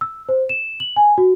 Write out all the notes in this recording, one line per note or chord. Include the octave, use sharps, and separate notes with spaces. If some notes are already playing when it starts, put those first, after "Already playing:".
E6
C5
E7
F#7
G#5
F#4